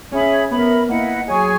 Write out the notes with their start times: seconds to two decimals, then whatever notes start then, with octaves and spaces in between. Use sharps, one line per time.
0.12 C#4 G#4 C#5 E5 B5
0.51 B3 A#4 E5 B5
0.89 A#3 E4 B4 D#5 F#5
1.27 F#3 G#4 C#5 G#5 C#6